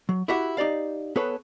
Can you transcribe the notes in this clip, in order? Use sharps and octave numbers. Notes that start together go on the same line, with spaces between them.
F#3
E4 F#4 G4 E5 F#5
D#4 G4 D5 F5
B3 G#4 A4 B4 C#5